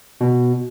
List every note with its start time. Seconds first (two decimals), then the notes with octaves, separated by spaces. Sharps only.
0.20 B2